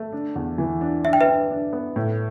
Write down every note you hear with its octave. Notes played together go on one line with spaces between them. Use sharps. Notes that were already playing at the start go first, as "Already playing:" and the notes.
Already playing: A3
D4
E2
E3
D4
D4 E5
G5
B4 E5
D4
D4
B3
A2